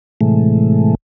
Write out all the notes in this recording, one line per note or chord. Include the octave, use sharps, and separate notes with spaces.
A2 C3 E3 G#3 A3